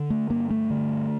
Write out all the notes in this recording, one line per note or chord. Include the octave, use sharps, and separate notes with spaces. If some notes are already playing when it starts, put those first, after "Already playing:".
Already playing: D3
A3
G2 A#3
A3
D3